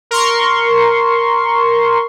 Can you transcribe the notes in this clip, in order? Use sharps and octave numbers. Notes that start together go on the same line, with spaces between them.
A#4 C6 C#6